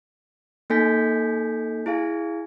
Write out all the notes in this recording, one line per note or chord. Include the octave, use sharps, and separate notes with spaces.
A#3 D#4 A4 G#5 G6 B6
E4 G#4 F5 G#5